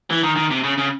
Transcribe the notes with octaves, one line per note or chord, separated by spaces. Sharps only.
E3
D#3
D#3
C3
C#3
C#3